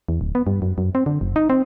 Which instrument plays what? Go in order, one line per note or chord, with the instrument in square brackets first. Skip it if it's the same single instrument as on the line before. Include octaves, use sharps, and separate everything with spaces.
[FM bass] E2
D1
B3
G2
F#2
F#2
C4
D3
F#1
D#4
C4